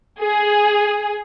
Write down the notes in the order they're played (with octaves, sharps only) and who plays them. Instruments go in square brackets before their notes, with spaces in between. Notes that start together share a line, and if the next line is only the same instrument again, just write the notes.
[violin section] G#4